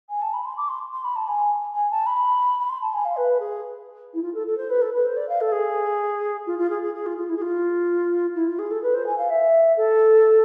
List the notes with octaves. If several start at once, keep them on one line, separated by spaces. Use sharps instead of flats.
G#5
A5
B5
C6
D6
C6
C6
B5
A5
G#5
G#5
A5
B5
B5
C6
A5
G#5
F5
B4
G#4
E4
F4
A4
A4
C5
B4
A4
B4
C5
D5
F5
A4
G#4
F4
F4
G#4
G#4
G#4
F4
F4
E4
G#4
F4
E4
F4
G#4
A4
B4
C5
G#5
F5
E5
A4